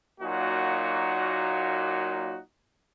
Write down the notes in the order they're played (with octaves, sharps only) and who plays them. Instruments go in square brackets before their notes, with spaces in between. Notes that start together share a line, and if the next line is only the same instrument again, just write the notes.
[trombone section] A#2 F#3 A#3 D#4 F#4